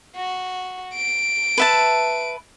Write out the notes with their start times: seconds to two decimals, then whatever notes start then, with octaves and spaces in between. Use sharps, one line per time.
0.16 F#4
0.95 D7
1.58 B4 E5 A5